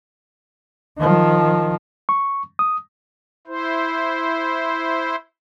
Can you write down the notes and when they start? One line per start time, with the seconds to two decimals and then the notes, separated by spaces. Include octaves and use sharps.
0.98 D#3 F3
2.09 C#6
2.59 D#6
3.47 E4 C5